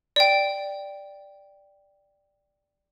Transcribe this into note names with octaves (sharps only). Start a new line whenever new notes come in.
D5 G5